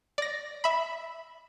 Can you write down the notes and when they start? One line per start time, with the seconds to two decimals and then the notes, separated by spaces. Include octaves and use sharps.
0.18 D5 A#6
0.64 E5 B5